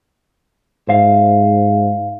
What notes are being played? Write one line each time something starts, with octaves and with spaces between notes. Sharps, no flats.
G#2 C5 E5 F5